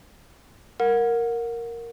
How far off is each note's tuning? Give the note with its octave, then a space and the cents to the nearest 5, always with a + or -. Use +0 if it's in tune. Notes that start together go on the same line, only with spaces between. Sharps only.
A#4 +0 F#5 -25